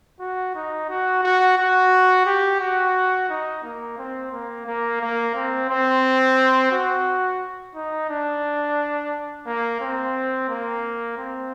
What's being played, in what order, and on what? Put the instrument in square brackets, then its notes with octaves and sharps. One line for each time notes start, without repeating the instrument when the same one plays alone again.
[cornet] F#4
D#4
F#4
F#4
F#4
G4
F#4
D#4
A#3
C4
A#3
A#3
A#3
C4
C4
F#4
D#4
D4
A#3
C4
A#3
C4